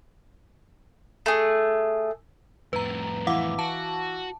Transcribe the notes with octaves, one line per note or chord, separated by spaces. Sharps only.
A3 G#4
F2 A2 B4 A#5
E3 F5 F#5 D6
F#4 A5